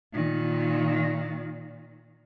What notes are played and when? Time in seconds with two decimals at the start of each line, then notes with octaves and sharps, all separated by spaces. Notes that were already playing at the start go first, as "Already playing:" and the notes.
0.13 A#2 D#3